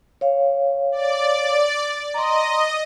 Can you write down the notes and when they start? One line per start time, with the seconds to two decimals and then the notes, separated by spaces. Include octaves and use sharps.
0.21 C#5 F5
0.92 D5
2.14 D#5 A#5 C6